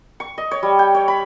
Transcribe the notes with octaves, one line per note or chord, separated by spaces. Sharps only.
C#6
D#5
C#5
G3
G5
C#5
B5